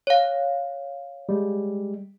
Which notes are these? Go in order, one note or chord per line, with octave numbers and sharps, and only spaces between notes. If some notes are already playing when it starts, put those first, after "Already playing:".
C#5 F5
G3 G#3